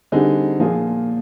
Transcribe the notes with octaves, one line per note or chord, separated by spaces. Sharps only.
D3 G3 C4 D#4 G#4
A#2 F3 A#3 F4 G#4